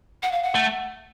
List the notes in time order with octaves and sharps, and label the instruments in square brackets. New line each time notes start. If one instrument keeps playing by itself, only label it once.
[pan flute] F#5
F5
F#5
[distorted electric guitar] A3